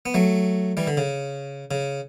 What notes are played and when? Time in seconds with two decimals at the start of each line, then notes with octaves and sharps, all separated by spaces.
0.06 B3
0.14 F#3 A3
0.77 E3 G3
0.87 D3
0.97 C#3
1.71 C#3